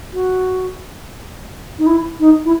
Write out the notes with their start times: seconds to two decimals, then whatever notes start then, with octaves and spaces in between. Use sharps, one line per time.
0.14 F#4
1.79 D#4
1.87 E4
2.20 D#4
2.45 E4